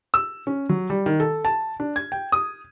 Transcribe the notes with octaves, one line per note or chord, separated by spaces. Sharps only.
E6
C#4
F#3
G3
D#3
A4
A5
D4
G#6
G5
D#6